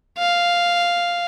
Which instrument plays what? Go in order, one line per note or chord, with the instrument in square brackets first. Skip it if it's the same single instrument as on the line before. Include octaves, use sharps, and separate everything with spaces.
[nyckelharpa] F5